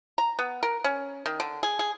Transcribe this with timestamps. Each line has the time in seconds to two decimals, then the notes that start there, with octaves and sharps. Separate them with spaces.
0.18 A#5
0.39 B3
0.63 A#4
0.84 C#4
1.26 D#3
1.40 D3
1.63 G#4
1.79 G#4